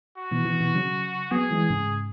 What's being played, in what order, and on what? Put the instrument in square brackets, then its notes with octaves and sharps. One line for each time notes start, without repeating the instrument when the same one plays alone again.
[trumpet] F#4
[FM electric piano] B2 E3
B2 E3
B2 E3
C#3 F#3
[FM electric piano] F#3 B3 [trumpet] G#4
[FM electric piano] E3 G#3
G#2 C#3